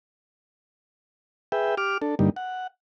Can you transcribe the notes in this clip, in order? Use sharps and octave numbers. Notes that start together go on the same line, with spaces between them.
G#4 B4 E5 G5
G4 D6 F6
D4 A4
G2 D3 G3 A#3 D#4
F#5